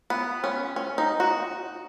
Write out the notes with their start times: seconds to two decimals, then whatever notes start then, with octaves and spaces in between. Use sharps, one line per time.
0.10 B3
0.44 C#4
0.76 C#4
0.98 D#4
1.20 F#4